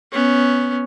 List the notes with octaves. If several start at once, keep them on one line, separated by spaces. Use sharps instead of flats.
B3 C#4